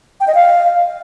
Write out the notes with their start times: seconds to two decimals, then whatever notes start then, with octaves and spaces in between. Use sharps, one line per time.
0.20 G5
0.27 D#5
0.35 F5